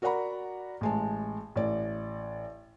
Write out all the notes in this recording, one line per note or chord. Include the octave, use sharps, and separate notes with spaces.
F#4 A#4 D5 F#5 A#5 B5
A1 G#3 A5
A1 D5